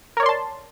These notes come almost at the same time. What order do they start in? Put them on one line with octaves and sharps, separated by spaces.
A#4 C#5 D5 C6 A5